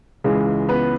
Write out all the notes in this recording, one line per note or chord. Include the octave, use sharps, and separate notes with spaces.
C#2 C#3 E3 G#3 G#4
B3 B4